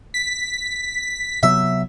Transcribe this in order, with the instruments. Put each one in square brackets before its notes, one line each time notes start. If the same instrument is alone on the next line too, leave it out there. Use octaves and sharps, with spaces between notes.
[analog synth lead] B6
[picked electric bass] C3 F#3 B3 [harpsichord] E5